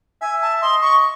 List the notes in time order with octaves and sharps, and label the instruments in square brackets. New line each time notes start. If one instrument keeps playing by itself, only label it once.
[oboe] E5 [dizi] G#5
[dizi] A5
[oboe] D#5 [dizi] C6
[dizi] C#6